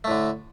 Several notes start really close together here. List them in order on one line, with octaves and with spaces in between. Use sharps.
A3 A2 D3